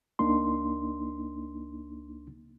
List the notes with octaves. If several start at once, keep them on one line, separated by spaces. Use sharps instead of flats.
C#2 A#3 D4 D#4 C6